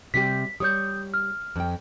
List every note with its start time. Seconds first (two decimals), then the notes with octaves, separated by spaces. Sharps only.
0.14 C3 G3 G4 B6
0.60 G3 C#5 D#6 G6
1.14 F6
1.56 F2 G5